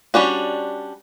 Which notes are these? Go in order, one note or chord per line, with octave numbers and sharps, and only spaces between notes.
G3 C#4 D4 F#4